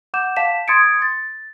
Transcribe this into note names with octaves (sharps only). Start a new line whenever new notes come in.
F#5 D6 G6 E7
F5 A5 B6 E7
C6 D#6 G#6 A6 C#7 D7
A6